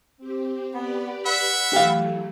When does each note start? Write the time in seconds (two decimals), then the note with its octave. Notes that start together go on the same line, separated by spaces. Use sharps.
0.18 C4 G4
0.74 B3 G4 B4 D5
1.25 E5 F#5 B5
1.73 E3 F#3 A3 G4 F5